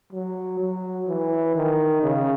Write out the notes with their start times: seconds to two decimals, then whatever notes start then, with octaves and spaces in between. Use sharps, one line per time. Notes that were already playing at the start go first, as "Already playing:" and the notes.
0.12 F#3
0.60 F#3
1.08 E3
1.55 D#3
2.02 C#3